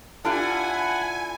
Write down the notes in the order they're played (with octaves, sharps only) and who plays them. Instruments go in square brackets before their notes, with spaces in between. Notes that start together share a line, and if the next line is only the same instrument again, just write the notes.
[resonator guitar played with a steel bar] D4 F4 G4 [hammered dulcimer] E4 A4 [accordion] F#5 [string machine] G#5